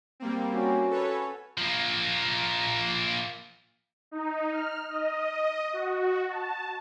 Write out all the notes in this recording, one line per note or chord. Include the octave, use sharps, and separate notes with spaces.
G3 A#3 C4
C#4 F#4
A4 B4 C#5
F3 A#3
D#4
F6
D#5
F#4
A5